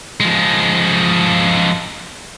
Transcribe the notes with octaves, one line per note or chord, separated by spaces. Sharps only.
F3 G#3